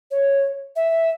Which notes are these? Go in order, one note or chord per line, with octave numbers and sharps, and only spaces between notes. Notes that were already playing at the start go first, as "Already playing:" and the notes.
C#5
E5